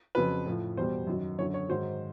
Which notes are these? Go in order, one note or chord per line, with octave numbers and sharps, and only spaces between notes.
F2 C#3 F#3 B4
A2 F3
E2 B2 G3 C5
F#2 D#3 F#3
F#2 D3 F#3 C#5
C#5
G#2 D#3 F#3 C5